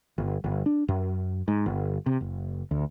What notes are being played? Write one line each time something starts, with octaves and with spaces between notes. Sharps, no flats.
G1
G1
D4
F#2
G#2
G1
C3
F#1
D2